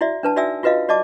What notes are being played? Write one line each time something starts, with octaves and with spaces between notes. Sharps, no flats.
E4 F#4 D5 E5
D4 B4 A5
D#4 F#4 D5 E5 G#5 E6
F4 F#4 B4 D#5 F5
F#4 D5 D#5 A5 D6